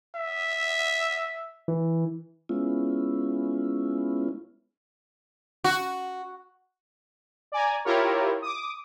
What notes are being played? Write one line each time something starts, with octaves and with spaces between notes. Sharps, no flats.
E5
E3
G#3 B3 C#4 E4 F4
F#4
D5 G#5 A#5
E4 F4 G4 A#4 C#5
D6 D#6